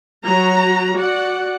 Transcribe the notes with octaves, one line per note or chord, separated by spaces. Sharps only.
F#3 F#4 A#5
F#4 D5 F#5